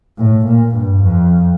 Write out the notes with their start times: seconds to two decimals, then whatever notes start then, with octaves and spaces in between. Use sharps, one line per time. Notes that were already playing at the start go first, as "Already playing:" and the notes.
0.18 A2
0.46 A#2
0.75 G2
1.04 F2